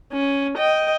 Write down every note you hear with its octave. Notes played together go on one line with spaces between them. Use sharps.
C#4
D#5 G5